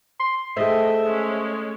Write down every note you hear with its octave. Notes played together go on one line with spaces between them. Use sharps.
C6
A3 G#4 C5 D#5 E5 G5
G#3 C#4